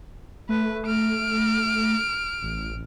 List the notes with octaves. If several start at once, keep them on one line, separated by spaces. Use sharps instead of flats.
A3 B4
F6 D7
A1